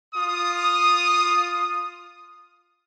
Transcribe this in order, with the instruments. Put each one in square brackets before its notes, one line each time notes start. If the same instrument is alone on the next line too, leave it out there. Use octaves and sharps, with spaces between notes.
[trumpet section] F4 D#6